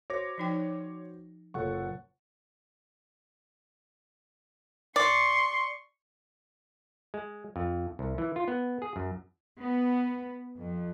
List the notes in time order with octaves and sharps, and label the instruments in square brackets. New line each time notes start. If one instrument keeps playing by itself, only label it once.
[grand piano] F#4 C5 [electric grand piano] C#5 D6 A#6
[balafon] F3 D#4 G5
[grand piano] F#1 A#2 C#5 [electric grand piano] A4 F#5 C#6
[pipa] D5 [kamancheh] C6 C#6
[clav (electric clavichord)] G#3
F2
C2
E3
F4
B3
G#4
F#2
[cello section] B3
F2